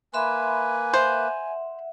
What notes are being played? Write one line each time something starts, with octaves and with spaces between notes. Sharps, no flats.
A#3 B4 E5 G#5 B5 C6
C5 E5 F#5